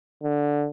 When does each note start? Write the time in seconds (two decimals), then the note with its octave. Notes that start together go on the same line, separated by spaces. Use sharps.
0.23 D3